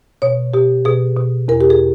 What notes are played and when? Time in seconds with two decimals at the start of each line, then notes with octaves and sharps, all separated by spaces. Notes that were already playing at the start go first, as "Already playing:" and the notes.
0.22 B2 C#5
0.54 B2 G4
0.85 B2 G#4
1.17 B2
1.48 E2 A#4
1.61 G4
1.70 G#4